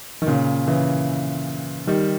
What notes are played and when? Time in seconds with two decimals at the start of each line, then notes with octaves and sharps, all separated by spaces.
0.22 D#3
0.27 A#2 C#3
0.67 C#3 E3
1.87 D#3 G3